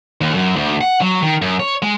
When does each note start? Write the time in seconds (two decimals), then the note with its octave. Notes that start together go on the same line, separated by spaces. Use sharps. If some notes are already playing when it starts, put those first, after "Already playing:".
0.21 D#2
0.34 F#2
0.56 D2
0.81 F#5
1.01 F#3
1.23 D#3
1.42 F#2
1.60 C#5
1.82 G#3